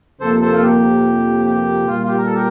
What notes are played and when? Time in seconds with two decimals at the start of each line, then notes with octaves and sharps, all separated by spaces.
0.20 F2 C3 F3 A#3 A4 C5
0.41 A4 C5
0.52 F4 A4
0.62 G4
1.46 G4
1.87 A#2 G3 A#3 F4
2.03 F4
2.07 G4
2.18 A#4
2.26 A4
2.33 G4 A#4